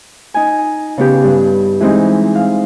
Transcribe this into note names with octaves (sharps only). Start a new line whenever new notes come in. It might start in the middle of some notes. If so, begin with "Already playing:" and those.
D#4 G#5
C#3 B3 G4
G2
E3 G#3 C4 D#4
F5